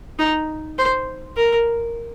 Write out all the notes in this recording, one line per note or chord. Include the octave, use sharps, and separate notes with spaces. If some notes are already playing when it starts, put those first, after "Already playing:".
D#4
C5
A#4